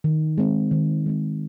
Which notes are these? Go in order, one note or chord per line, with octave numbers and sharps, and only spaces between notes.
D#3
G#3 C4
D#3
G#3 C4